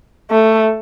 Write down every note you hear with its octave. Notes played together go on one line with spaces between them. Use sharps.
A3